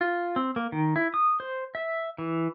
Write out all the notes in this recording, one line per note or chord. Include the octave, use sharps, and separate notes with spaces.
F4
C4
A#3
D#3
E4
D#6
C5
E5
E3